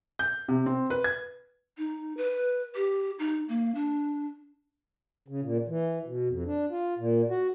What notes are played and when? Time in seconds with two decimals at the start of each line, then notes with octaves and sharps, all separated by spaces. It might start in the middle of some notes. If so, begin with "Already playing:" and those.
0.19 G6
0.48 C3
0.66 C4
0.90 B4
1.04 G#6
1.78 D#4
2.17 B4
2.75 G4
3.19 D#4
3.48 A#3
3.75 D4
5.28 C#3
5.42 A#2
5.68 E3
6.05 B2
6.29 F2
6.46 D4
6.71 F4
6.98 A#2
7.30 F#4